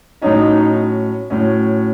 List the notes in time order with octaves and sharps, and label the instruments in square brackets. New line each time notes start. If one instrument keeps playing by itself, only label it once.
[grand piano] A2 F#3 C#4 [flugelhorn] D#4
[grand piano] A2 F#3 C#4